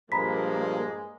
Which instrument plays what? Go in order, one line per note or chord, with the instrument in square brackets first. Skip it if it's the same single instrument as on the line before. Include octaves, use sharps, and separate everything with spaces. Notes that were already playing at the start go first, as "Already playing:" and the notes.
[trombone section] G2 A#2 F3 [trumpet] G#3 [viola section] A#3 [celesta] A#5 B5 B6